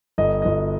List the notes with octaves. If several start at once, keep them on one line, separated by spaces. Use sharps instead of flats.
G1 D#5
G1 D#5